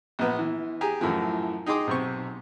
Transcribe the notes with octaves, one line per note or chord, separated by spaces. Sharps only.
A#1 A#2 B3 B4
E3
G4 G#4 G#5 A#5
F#2 A2 E3 F3
D#4 G#4 G5 C6 D6 D#6
B1 C3 C5 C#6